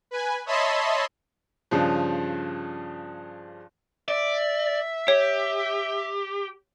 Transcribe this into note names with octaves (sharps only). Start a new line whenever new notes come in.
B4 G#5
C#5 D#5 E5 A5 B5 C6
G2 C#3 F3
D5 E5
G4 C#5